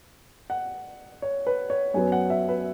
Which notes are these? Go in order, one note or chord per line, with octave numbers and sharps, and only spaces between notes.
F#5
C#5
B4
C#5
F#2 F#3 B3 G#5
F#5
E5
B4